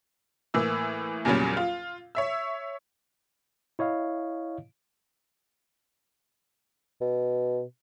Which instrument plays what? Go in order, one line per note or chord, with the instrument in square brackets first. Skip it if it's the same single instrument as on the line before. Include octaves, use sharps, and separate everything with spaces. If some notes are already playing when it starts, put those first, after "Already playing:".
[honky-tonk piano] A2 E3 A#3 E6
E2 A#2 C#3 F#3 G3 C#4
F4
C#5 E5 E6
[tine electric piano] E4 C#5 D#5 F5
[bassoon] B2